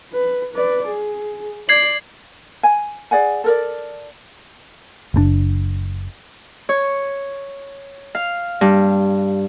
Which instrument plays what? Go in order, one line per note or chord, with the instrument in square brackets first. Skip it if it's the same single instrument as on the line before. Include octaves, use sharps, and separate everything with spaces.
[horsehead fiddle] B4
B4 D5
G#4
[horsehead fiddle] D5 [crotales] G#6 C7 F#7
[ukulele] G#5
G#4 D5 F#5 G#5
A4 A#4 D5
[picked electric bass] F#1 B2 D4
[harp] C#5
F5
G2